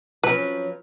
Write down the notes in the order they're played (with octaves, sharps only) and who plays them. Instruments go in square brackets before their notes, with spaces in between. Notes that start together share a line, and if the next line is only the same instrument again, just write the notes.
[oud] F3 F#3 C#4 [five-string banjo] B4